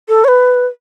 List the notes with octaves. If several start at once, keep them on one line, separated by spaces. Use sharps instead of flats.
A4
C#5
B4